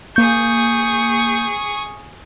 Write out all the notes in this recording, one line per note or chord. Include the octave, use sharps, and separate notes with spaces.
A#3 G#4 C#6 G6